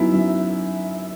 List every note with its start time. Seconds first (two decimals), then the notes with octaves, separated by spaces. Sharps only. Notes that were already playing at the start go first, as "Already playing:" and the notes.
Already playing: F#2 F#3 B3 D#4 E4 E5
0.13 F#2